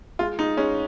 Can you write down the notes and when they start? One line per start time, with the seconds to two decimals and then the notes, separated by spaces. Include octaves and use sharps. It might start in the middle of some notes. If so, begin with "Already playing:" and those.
0.19 G#3 F4
0.39 G#3 D#4
0.57 G#3 C#4